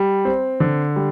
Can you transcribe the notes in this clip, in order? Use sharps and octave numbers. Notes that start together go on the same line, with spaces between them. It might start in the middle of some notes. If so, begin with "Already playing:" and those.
Already playing: G3
C4
D3
G3